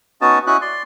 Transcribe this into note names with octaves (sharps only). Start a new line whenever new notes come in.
B3 C#4 D#4 F#4 D#5 A5
C#4 E4 F#4 D#5 F#6
D5 C6